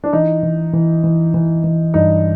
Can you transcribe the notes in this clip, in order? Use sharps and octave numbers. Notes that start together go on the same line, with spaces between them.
D4
E3 D#4
E3
E3
E3
E3
E3
G2 D#4